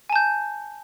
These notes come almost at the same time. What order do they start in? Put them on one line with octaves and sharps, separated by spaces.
G#5 A5 G6